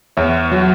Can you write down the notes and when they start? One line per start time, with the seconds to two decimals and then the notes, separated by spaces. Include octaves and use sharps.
0.17 E2 C#5 E5
0.51 F#3 F#4